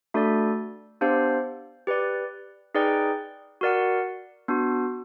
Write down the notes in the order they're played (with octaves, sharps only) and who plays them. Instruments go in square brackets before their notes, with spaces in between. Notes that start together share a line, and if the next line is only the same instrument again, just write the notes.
[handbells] A3 D4 F#4 A4 D5
B3 D4 G4 C5 F5
G4 B4 D5
D#4 G#4 B4 D5 G5
F#4 A#4 D5 F#5
B3 D4 F#4